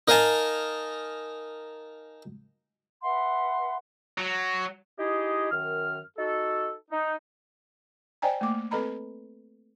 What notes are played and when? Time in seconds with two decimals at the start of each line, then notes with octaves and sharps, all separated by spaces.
0.08 D#4 A#4 D#5 F5 G#5 A5
3.02 B4 E5 F#5 C6
4.18 F#3
4.99 D#4 E4 G4 G#4 D#5
5.51 F#2 D#3 F6
6.18 D#4 F#4 A4
6.91 D#4
8.22 C5 D5 D#5 G5 G#5 A#5
8.41 A3 A#3 D6
8.71 C4 A4 B4 D#5 A#5 B5